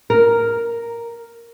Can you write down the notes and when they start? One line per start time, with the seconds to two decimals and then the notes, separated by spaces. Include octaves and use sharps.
0.10 A#4